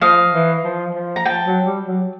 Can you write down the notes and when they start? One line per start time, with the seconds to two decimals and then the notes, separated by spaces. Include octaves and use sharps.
0.01 F3 D#5 F5
0.33 E3
0.64 F3
0.95 F3
1.16 A#5
1.25 F3 G5 A5
1.46 F#3
1.66 G3
1.87 F#3